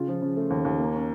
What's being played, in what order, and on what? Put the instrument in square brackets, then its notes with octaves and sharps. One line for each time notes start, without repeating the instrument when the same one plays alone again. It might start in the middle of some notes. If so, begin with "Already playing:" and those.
Already playing: [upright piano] C#3 F4
F3
C#3
A3
D#2
D#2
A#3
C#4